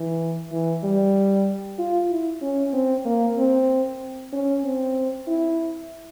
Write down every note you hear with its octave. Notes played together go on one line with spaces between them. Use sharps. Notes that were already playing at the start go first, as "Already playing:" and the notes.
Already playing: E3
E3
G3
F4
E4
C#4
C4
A#3
C4
C#4
C4
E4